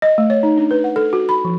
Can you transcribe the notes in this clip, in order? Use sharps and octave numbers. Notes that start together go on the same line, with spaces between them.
D#5
A3
C#5
D#4
D4
B4
F#5
A4
F#4
B5
F3